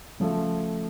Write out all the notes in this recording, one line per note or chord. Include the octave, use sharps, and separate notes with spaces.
C#3 F3 A3